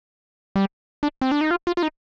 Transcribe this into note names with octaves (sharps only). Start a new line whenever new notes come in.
G3
D4
C4
D4
D#4
F4
F4
F4
D#4